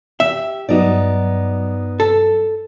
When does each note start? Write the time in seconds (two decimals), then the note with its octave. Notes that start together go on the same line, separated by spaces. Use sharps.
0.20 G4 E5
0.69 G2 F#3 B3 D#4 D5
2.00 A4